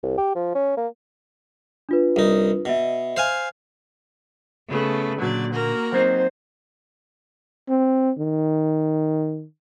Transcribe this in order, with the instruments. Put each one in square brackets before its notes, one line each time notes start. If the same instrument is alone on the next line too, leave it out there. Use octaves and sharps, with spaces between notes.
[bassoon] C2
G4
F3
C#4
A#3
[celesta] D4 F4 B4
[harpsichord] C2 D#4
[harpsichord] B2 [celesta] D#5 E5
[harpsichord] C5 F5 G#5
[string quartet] C#3 A3 B3
[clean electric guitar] A#2 D3 [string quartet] F#3 D5
[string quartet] A#3 F#4 A#4
[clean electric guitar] F#3 C4 D#4 [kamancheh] C5
[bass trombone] C4
D#3